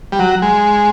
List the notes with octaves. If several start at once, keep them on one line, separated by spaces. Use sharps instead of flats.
G3
F#3
G#3